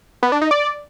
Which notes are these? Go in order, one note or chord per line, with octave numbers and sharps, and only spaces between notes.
B3
D4
D#4
D5